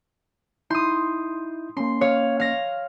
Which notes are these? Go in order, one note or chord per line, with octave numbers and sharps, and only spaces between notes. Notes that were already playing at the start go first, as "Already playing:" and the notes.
D#4 E4 C6 D#6 G6
A#3 C#4 C6
C#5 F5
F5 A#6